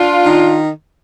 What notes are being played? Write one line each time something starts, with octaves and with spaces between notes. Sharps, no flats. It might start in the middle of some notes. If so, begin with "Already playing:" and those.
Already playing: D4 F4
D#3